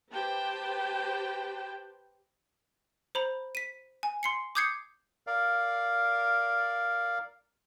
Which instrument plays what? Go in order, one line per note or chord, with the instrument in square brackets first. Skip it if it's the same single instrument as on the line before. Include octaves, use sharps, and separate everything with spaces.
[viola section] G4 B4 C5 G5 A5
[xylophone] C5 A#5 B5
B6 D#7
G#5
C6 C7 C#7
D6 D#6 G6 G#6 C7 C#7
[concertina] A#4 D5 F5